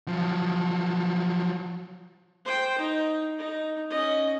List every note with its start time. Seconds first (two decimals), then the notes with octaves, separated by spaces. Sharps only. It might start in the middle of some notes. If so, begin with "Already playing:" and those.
0.08 F3 F#3
2.45 C5 G5
2.78 D#4
3.39 D#4
3.90 C#4 D#5